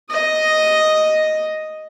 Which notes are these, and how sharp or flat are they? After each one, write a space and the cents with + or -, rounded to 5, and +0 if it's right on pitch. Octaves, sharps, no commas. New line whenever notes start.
D#5 +0 D#6 +0